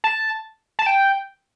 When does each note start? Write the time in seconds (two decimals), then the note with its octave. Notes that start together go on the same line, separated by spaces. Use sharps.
0.04 A5
0.79 A5
0.86 G5